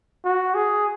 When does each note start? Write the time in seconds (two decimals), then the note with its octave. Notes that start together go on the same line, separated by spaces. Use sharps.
0.24 F#4
0.55 G#4